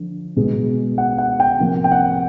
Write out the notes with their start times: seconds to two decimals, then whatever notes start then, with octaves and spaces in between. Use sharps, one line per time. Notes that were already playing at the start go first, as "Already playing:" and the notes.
Already playing: D3 F3
0.37 B2 G#3
0.98 F#5
1.18 F#5
1.40 G5
1.60 C3 F3 A#3
1.84 G5
1.92 F#5